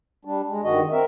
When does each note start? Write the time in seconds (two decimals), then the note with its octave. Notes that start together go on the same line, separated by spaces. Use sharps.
0.25 G3 D4
0.49 G#3
0.64 G2 D#3 F#4 D#5
0.91 C4 A#4 E5